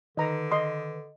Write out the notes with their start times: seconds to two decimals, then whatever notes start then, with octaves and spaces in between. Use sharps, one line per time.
0.17 D3 D#3 B4 D#5 A#5
0.51 D#5 C6 D#6